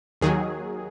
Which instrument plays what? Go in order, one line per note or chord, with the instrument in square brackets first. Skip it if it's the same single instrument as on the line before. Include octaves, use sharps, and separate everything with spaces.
[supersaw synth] D#2 D#3 F#3 G#4